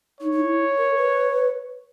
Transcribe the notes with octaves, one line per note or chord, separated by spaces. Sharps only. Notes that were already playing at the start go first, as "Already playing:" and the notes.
D#4 C#5
D#4
E4
A#4
B4